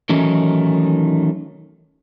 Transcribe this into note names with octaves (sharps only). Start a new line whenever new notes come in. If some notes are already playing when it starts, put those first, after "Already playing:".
D#3 E3 F#3 A3 C#4 D#4